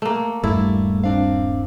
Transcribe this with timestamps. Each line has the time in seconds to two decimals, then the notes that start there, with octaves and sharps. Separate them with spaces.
0.02 A3 A#3
0.44 D#1 G2 G3 A3 E4
1.04 C4 D4 F5